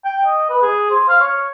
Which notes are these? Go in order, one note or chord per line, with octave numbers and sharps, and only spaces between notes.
G5
D#5
B4
G#4
C5
F5
C#5